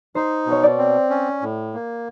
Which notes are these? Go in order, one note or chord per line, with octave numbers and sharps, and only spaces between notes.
D#4 C5
B2
C#5
D5
C4
C#4
A2
A#3